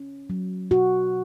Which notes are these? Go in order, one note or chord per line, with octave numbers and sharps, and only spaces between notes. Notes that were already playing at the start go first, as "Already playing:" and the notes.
Already playing: C#4
F#3
B2 F#4